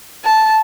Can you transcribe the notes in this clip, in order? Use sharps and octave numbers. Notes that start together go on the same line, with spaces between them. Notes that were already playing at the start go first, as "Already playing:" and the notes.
A5